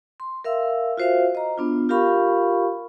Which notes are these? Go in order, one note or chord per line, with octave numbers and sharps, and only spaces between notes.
C6
A#4 E5 F5 E6
F4 F#4 C5 E5 F5
D#5 A#5
B3 D4 F4
F4 G4 A#4 F5 B5 C#6